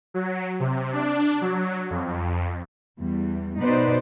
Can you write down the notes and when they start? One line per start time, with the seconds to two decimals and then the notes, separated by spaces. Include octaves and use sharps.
0.14 F#3
0.60 C3
0.93 D4
1.41 F#3
1.90 F2
2.99 E2 E3 G3
3.60 B2 B3 D#4 B4 C5 D5